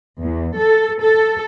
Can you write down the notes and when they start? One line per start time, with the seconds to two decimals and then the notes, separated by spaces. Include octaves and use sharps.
0.20 E2
0.56 A4
1.00 A4